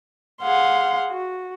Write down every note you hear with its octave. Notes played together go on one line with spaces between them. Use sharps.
G#4 F5 F#5 C6
F#4